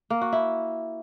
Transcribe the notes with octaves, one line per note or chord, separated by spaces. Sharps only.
A#3
F#4
E4